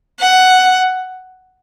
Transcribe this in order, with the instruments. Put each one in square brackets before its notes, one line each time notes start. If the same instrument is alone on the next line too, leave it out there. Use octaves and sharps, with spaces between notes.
[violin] F#5